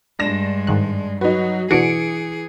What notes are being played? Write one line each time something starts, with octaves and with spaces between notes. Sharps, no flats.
G2 G#3 D4 A#6 E7
G#2 D#3 F#6
F#3 D#4 F#4 B4
B2 E3 D4 F#4 G#4 C#7 D7